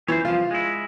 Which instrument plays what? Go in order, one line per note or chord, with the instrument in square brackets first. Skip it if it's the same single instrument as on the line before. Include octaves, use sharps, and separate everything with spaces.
[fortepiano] E3 [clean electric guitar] C5 C#5
[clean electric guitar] C2 F3 [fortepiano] F4
[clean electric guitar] G#3 E4